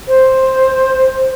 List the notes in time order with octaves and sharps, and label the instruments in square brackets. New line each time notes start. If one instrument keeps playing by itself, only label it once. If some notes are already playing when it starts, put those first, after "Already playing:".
[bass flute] C5